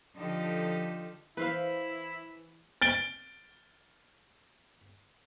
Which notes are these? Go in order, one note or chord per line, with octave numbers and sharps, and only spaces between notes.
D3 F3 D#4 F4 G4 A4
E3 E4 B4 C5 F5
A6 D7 G7